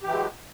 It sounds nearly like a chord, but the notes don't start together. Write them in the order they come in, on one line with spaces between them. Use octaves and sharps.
G4 E3 F#3 G#3